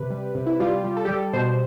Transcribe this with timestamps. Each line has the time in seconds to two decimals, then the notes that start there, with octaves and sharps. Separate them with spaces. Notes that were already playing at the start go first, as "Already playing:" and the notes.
Already playing: C3 B4
0.10 G3
0.35 C3
0.46 E4
0.60 G3 F4
0.84 G3
0.97 A4
1.05 G3 G4
1.14 A4
1.33 B2 C5